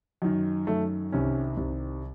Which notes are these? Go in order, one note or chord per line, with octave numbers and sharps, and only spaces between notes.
F#2 D#3
F#2 D#3 A3
C2 C3 D#3 C#4
C2 C3 D#3